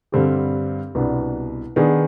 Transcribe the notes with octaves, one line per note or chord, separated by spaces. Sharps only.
G2 D3 G3 C4 G4
C2 B2 B3 D4
D#3 B3 D4 G#4